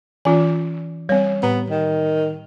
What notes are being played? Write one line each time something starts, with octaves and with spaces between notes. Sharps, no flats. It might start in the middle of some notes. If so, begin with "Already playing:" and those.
E3 C#4 F4 G#5
G3 C4 C#5
A2 B3
D#3